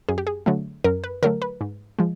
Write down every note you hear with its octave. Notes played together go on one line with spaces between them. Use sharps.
F#2 G#4
G4
G#4
D3 F#3 A3
F#2 A#4
B4
D3 F#3 A3 A#4
B4
G#2
F3 G#3